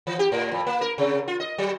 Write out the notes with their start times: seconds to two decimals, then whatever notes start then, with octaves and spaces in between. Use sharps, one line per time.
0.07 E3
0.19 G4
0.32 A2
0.52 F2
0.66 A#3
0.81 A#4
0.98 C3
1.28 F4
1.40 D#5
1.58 F#3